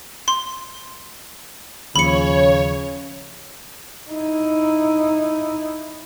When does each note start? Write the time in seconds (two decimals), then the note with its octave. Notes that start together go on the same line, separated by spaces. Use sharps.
0.28 C6
1.96 D#2 C#3 F3 C#5 B5 C#7
4.11 D#4 E4